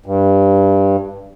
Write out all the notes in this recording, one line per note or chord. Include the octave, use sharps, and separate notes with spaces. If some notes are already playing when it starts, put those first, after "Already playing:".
G2